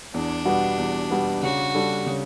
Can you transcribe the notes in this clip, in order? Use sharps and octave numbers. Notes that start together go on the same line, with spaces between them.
E2 D4
B2 G3 B3 F#4
E2
B2 G3 B3 F#4
C#3 F#4
G3 D4 A4
C#3